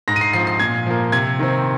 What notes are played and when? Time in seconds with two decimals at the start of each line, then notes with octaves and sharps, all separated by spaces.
0.08 G#2 A#6
0.16 D#7
0.21 C7
0.33 F3 C4 C7
0.47 C7
0.60 A#2 G#6
0.86 F3 A#3
1.12 C3 G#6
1.39 D#3 C4